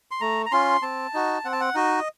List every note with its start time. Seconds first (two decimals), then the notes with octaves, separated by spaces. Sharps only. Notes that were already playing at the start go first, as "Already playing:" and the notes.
0.11 C6
0.21 A3 A#5
0.46 A#5
0.52 C#4 F4 C6
0.82 C4 A5
1.14 D#4 F#4
1.45 C4 F#5
1.53 A5
1.61 F#5
1.75 D#4 F#4 D#5